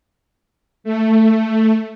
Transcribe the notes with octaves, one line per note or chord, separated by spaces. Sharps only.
A3